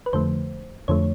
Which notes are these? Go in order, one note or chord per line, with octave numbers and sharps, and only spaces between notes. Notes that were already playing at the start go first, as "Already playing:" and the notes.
B4
F2 D3 F3 A3 C5
F2 D3 F3 A3 C#5